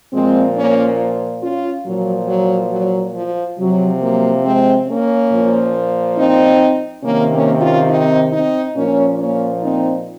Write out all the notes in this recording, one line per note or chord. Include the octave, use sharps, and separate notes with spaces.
A#2 F3 G#3 C4
A#3 C#4
C#4 F4
A#2 F3 F#3
F#3
F#3
F3
C3 F3 F#3
F#3 A#3
G#3 C4
A#3 C#4
A#2 F3
C4 D#4
C3 D#3 A#3 C#4
A#3 C#4
C#4 F4
C4 D#4
C4 D#4
A#2 F3 A#3 C#4
A#3 C#4
C4 D#4